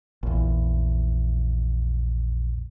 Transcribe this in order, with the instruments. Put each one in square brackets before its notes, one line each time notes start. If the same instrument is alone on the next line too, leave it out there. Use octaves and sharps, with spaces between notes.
[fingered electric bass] A#1 E2